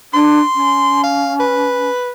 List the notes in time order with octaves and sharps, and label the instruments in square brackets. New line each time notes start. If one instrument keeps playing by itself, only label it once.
[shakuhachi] D4 [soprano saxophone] C6
[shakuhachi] C#4
[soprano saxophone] F5
B4